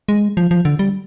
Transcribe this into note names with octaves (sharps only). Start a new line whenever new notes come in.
G#3
F3
F3
D3
G3